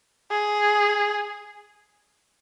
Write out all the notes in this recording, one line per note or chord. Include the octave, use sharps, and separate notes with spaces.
G#4